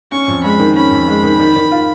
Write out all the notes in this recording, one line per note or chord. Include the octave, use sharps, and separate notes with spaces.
C#4 C#6
F2
G#3 B5
D#3
C#4 B5
F2
G#3
D#3
D#3
D#3
F4